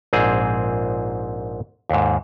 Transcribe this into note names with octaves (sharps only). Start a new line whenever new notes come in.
A#1 G#2 C4 G#4
D#2 G#2